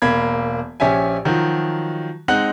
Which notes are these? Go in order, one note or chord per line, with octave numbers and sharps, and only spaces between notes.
E1 A#3 B5 G#6
A#1 C#4 G4 E5 G#5
D#3 F3 F#3 F#4
G#3 C4 D#4 D#5 F#5 F#6